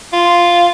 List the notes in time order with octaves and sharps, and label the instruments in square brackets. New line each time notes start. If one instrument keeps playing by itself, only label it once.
[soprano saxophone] F4